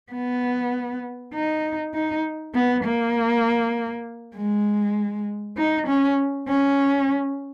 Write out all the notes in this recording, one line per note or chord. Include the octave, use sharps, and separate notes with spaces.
B3
D#4
D#4
B3
A#3
G#3
D#4
C#4
C#4